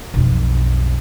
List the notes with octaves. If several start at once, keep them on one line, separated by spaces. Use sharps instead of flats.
B1 F2